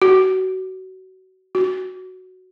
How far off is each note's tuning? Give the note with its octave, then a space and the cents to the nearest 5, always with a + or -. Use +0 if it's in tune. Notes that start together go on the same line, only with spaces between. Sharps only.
F#4 +25
F#4 +0